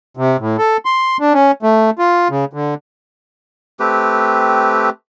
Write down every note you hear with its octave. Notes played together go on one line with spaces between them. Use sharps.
C3
A2
A4
C6
D4
C#4
A3
F4
C#3
D3
A3 C4 G4 B4